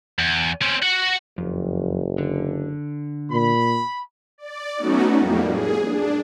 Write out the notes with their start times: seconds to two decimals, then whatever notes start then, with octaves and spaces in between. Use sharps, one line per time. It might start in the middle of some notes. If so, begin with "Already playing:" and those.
0.19 E2
0.62 C4 C#4
0.83 F#4 F#5
1.38 F#1 F2
2.18 D3
3.32 A#2 B5
4.38 D5
4.77 F#3 A3 B3 C#4 D#4 F#4
5.15 F2 A2 G3 A#3
5.47 G#4
5.83 D4